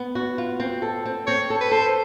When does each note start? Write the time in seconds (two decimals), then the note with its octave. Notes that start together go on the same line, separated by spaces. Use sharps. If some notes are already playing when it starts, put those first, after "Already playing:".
Already playing: B3
0.15 F#4
0.38 F4
0.60 C4
0.82 A4
1.06 C4
1.27 C4 C#5
1.50 A4
1.61 B4
1.71 A4 C5